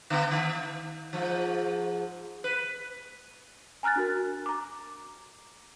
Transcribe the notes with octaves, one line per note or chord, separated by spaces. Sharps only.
D3 B3
D#3
G#2 F3
B4
G#5 A#5 F6 F#6 A6
D4 F#4 A#4
A#5 D6